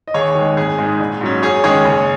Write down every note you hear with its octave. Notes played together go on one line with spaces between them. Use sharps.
D#5
D#2 G#4 C#5
D#3 G#3
G#1 G#4
G#2 G#3 D#4
A#1
G#2 F#3 C#4
F#2 G#4 C#5
D#3 G#3 C#4 G#4 C#5
F#1